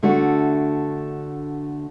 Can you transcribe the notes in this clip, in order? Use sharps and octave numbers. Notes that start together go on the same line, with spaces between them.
D3 A3 D4 F#4